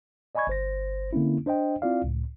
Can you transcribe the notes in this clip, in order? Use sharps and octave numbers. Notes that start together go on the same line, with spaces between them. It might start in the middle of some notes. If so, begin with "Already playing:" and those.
D5 D#5 G#5 B5 C#6 G#6
G1 C5 A#6
D3 A#3 C4 C#4 E4
D4 C5 D#5 G5
C4 E4 F4 D5 F5
C#2 A2